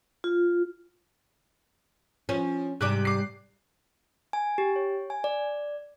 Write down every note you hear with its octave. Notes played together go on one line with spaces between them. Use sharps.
F4
F3 C#4
G#2 C3 G3 D6 F#6
D6 C7
G#5
G4
C#5
G#5
D5